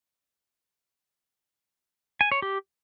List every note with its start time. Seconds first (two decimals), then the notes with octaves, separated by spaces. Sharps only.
2.21 G#5
2.32 C#5
2.42 G4